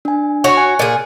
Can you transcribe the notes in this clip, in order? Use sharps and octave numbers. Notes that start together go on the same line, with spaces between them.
D4 G#5
F#4 C#5
G#5 F#6 C#7
A#2 G#4